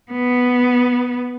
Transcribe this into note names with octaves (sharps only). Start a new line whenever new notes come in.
B3